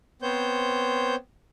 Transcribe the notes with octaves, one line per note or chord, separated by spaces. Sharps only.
B3 C4 C5 C#5 G6